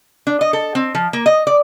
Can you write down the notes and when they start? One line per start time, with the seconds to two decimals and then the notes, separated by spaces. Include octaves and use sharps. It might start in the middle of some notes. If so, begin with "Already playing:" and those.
0.27 D4
0.41 D#5
0.53 A4
0.75 C4
0.95 F3
1.13 A#3
1.26 D#5
1.47 D5